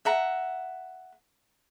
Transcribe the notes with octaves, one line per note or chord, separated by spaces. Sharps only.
E5 F#5 A#5